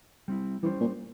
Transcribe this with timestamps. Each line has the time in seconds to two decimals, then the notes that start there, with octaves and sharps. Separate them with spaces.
0.28 G3 C4 E4
0.63 E3 G3 C#4 G4 C5
0.81 A#2